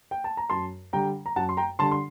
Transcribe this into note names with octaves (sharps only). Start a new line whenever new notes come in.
G5
A5
A#5
F#2 A5 C6
D3 G3 G5 A#5
A#5
F#2 F#5 A5
C6
G5 A#5
D3 G3 A5 C6
C6